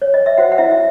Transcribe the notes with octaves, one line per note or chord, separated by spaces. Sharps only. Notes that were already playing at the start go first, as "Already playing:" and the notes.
C#5
D#5
E5
F#4 C5 F#5
F#5
E4 E5
E5